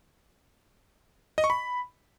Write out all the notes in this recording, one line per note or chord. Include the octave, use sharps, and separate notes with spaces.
D#5
C#6
B5